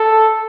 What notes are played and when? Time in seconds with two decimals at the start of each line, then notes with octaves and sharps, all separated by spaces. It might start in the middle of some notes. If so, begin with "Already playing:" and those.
Already playing: A4